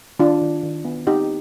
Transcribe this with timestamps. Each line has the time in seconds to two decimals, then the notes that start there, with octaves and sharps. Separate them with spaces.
0.19 D#3 D4 F4
0.41 D#3
0.63 D#3
0.85 B3
1.07 C4 D#4 G4